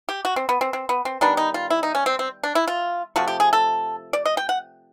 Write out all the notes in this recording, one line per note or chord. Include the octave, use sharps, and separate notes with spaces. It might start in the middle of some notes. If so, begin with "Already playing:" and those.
G4
F#4
C4
B3
C4
C4
B3
C4
D#3 G3 B3 D4
D#4
F4
E4
D#4
C#4
C4
C4
D4
E4
F4
C3 F3 A3 F#4
G4
G#4
A4
D5
D#5
G5
F#5